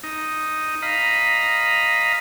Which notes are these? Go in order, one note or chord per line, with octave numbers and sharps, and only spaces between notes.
D#4
D#5 F5 A#5 B5